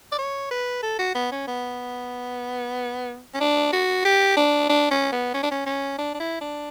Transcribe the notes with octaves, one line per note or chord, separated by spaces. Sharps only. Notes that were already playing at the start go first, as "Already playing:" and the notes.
D5
C#5
B4
A4
F#4
B3
C#4
B3
C#4
D4
F#4
G4
D4
D4
C#4
B3
C#4
D4
C#4
C#4
D4
D4
E4
D4